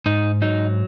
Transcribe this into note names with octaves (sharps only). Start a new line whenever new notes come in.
G#2 D#4
F#3 D#4